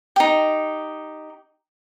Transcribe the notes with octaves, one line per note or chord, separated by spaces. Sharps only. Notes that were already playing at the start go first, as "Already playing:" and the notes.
D#4 G4